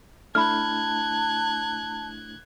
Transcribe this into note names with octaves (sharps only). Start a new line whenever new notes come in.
A3 D4 E4 A5 B5 F6 F#6 G#6